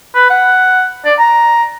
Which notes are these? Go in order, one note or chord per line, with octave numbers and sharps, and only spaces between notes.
B4
F#5
D5
A#5